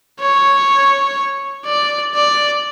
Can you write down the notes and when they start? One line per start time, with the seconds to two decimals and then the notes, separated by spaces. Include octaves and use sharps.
0.20 C#5
1.66 D5
2.15 D5